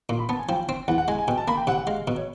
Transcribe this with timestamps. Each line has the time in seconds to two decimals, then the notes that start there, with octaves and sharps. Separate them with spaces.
0.09 A#2 C6
0.19 B5
0.29 B3 A5
0.39 G#5
0.49 F3 G5
0.69 C4
0.88 E2 F#5
0.98 F#5
1.08 G#3 G#5
1.18 G#5
1.28 B2 G5
1.38 A5
1.48 A#3 B5
1.57 G5
1.67 C3 F#5
1.78 F#5
1.87 G#3 F5
2.08 B2
2.17 C#5